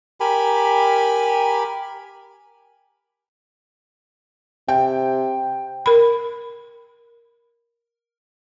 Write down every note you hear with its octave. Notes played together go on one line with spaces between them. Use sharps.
G4 A#4 G#5 B5
C3 G5
A#4 B5